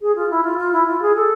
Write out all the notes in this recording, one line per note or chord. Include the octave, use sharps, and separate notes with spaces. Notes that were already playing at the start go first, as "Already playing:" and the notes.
G#4
F4
E4
F4
F4
E4
F4
G#4
A4